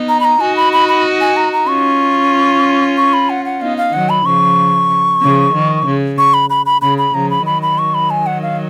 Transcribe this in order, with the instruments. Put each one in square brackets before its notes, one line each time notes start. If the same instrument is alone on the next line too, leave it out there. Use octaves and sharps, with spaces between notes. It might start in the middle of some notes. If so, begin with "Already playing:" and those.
Already playing: [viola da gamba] B3 D#4
[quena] A#5
B5
A#5
[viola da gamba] D#4 F#4 [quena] G#5
[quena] B5
B5
B5
G#5
A#5
A#5
[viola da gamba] C#4 F4 [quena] C#6
[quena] C#6
B5
F#5
F#5
[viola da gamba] B3 D#4 [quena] F5
[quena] F5
[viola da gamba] D#3 F#3 [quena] F#5
[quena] B5
[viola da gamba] C#3 F3 [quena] C#6
[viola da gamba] C#3 F3
D#3
C#3
[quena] C#6
B5
B5
B5
[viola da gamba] C#3 [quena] B5
[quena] B5
[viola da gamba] C#3 F3 [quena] A#5
[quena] B5
[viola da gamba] D#3 F#3 [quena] B5
[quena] B5
C#6
B5
G#5
F#5
F5